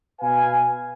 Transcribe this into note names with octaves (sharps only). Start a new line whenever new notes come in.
B2 B4 F5 G#5